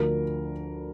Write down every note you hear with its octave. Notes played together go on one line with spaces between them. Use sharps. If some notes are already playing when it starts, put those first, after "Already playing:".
Already playing: D2 D3 F3 A#4